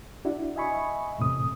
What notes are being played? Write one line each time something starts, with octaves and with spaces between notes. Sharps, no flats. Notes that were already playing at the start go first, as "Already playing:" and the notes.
D4 E4 F#4
D#5 E5 G#5 B5 C#6
E2 A2 C3 D#6